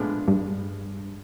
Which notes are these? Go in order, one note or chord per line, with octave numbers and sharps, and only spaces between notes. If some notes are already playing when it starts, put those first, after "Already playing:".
Already playing: A2 F3 G#3 B3 D4
G2